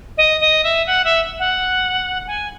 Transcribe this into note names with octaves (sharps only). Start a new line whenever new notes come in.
D#5
D#5
E5
F#5
E5
F#5
G#5